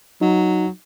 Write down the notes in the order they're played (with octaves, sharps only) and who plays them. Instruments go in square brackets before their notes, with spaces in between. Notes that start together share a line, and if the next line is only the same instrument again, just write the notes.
[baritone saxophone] F#3 [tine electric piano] D#4